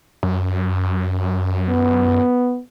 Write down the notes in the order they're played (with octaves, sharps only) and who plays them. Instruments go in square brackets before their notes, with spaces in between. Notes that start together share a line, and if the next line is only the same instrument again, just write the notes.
[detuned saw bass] F#2
[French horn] B3